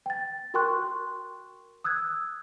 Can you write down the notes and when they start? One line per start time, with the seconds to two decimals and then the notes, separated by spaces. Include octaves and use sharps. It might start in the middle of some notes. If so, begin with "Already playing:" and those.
0.06 G5 A6
0.54 F#4 A#4 G5 C6 C#6 F#6
1.84 D#6 E6 F#6 G#6